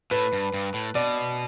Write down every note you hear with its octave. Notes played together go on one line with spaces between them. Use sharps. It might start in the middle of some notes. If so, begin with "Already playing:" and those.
A2 B4
G2
G2
A2
B2 D5